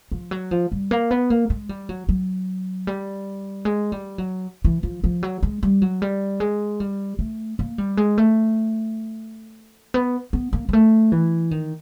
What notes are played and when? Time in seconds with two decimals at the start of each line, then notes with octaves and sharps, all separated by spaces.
0.11 F3
0.31 F#3
0.51 F3
0.72 G3
0.91 A#3
1.11 B3
1.30 A#3
1.50 G#3
1.69 G3
1.89 F#3
2.09 F#3
2.87 G3
3.65 G#3
3.92 G3
4.18 F#3
4.64 E3
4.83 F3
5.04 F3
5.23 F#3
5.43 G#3
5.63 G3
5.82 F#3
6.02 G3
6.40 G#3
6.80 G3
7.19 A3
7.59 A#3
7.78 G3
7.97 G#3
8.18 A3
9.94 B3
10.33 B3
10.53 A#3
10.69 G#3
10.73 A3
11.12 E3
11.51 D#3